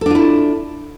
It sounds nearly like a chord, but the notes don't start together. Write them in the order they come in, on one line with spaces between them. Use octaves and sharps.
A4 D4 F4 E4